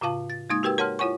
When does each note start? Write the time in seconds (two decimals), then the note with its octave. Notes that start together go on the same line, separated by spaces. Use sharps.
0.01 A2 C#3 F4 F5 A5
0.30 A6
0.50 G#3 A#3 D#4 D#6 G#6
0.63 F#4 G4 A#4 B4 G5 E6
0.78 A#4 C#5 F#5 A5 C6 F6
0.99 E4 F4 C#5 F#5 G#5 C#6